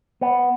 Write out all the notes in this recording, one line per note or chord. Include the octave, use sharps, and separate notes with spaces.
B3